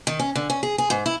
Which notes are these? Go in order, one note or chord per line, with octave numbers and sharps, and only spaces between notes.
D#3
C#4
D3
C#4
G#4
G#4
G#2
E4